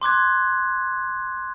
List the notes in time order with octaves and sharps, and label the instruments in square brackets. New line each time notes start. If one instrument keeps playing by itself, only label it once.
[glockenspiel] C6 D6 F#6 G#6